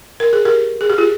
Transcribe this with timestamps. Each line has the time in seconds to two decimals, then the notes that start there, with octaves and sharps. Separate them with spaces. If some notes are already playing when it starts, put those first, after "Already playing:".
0.20 A#4
0.33 G#4
0.45 G4 A#4
0.81 G#4
0.90 G4
0.98 F4 G#4